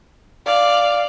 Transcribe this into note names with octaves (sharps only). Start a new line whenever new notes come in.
D5 F5